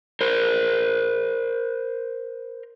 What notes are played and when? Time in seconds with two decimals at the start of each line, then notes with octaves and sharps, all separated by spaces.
0.21 A#4 C5